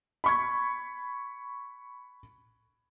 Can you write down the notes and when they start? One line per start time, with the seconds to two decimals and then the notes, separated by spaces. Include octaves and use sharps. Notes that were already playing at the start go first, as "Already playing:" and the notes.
0.24 B5 C#6 G#6